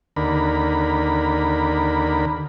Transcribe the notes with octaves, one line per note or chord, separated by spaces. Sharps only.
D#2 D3 A#4 B5